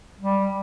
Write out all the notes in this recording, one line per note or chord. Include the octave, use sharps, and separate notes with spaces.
G3